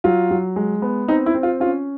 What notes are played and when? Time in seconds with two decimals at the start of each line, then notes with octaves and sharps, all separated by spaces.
0.04 F#3 F4
0.31 F#3
0.56 G#3
0.82 B3
1.08 C4 D#4
1.26 E4
1.34 C4
1.43 F4
1.60 C#4 F4